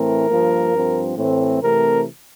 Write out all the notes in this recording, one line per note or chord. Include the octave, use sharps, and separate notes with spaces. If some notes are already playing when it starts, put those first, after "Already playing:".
Already playing: A2 E3 A3 C4 A#4
G2 F3 A#3
G2 F3 C4
A2 E3 A3 C4
C3 E3 A3 C4 A#4